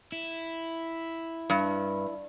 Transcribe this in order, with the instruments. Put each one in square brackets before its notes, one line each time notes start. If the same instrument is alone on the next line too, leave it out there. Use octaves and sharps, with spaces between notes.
[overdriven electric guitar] E4
[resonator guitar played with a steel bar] G2